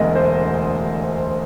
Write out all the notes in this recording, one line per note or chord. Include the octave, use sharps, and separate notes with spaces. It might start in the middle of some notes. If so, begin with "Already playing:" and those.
Already playing: E1 D2 D3 D#5
C5